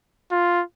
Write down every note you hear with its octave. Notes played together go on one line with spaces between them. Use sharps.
F4